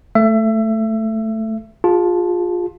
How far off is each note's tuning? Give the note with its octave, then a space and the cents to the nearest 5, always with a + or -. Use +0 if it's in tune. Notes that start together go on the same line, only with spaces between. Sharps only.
A3 +0 E5 +25
F4 +20 G#4 -30 A5 -10